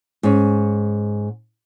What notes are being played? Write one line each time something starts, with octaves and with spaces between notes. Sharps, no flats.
G#2 C#4